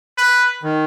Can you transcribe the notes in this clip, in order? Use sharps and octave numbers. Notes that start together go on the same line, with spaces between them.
B4
D#3